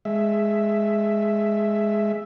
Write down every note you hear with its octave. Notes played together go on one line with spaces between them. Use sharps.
G#3 E5